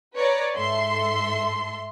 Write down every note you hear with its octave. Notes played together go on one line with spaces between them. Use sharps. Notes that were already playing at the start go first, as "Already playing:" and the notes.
B4 C#5 D5 A#5
G#2 A4 E5 C6